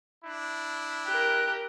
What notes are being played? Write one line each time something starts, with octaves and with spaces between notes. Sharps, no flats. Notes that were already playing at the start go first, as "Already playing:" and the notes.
D4 E4
G4 A#4 F#6